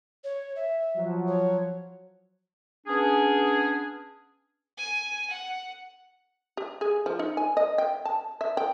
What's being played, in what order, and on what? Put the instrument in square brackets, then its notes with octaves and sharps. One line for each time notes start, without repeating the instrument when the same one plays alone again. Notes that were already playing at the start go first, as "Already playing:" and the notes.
[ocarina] C#5
E5
[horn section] F3 F#3
[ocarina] C#5
[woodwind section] B3 C#4 D4 G#4
[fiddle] G#5
F#5
[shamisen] G4
G#4
F3
D#4
G#5
D#5
G5
A5
E5
G5